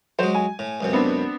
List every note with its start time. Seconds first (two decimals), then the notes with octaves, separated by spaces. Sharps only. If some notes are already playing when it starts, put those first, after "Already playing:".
0.19 F#3 G#3 C5
0.35 G#5
0.59 A2
0.81 C#2 F#2 C3
0.93 B3 C4 D4